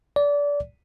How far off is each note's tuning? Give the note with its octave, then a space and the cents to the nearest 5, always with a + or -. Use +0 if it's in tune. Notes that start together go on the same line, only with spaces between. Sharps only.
D5 -25